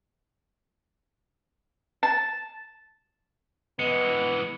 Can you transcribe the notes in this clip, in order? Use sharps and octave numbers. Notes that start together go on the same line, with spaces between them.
A5
E3 G#3 B3 C#7